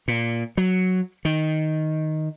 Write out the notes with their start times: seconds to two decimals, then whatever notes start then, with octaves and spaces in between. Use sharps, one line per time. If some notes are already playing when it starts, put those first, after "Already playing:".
0.08 A#2
0.57 F#3
1.25 D#3